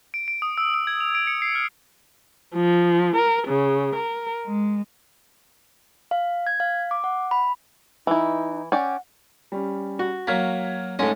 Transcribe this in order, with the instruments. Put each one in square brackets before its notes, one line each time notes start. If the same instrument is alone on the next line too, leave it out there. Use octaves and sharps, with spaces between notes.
[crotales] D7
D7
D#6
E6
E6
G#6
F7
D7
C#7
C7
F6
[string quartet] F3
A#4
C#3
A#4
G#3
[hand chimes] F5
G#6
F5
D6
F#5
B5
[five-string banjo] E3 E4 [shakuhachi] D#4
[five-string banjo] C#4 D5 G5 [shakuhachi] F#5
[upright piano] G3 C#4
[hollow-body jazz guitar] F#4
[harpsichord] F#3 A#3 [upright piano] F6 G#6 B6
[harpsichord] G#2 G#3 D#5 [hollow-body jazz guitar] A3 C#4